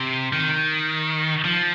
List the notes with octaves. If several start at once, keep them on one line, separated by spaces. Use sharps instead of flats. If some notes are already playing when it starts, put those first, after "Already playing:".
Already playing: C3
D#3
F3